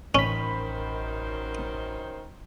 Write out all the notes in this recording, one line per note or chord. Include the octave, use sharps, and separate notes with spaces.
A1 F#2 D#3 C#4 C5 B5